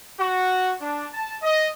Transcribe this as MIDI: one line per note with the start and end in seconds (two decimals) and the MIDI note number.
0.18 0.72 66
0.80 1.07 62
1.13 1.36 81
1.42 1.67 75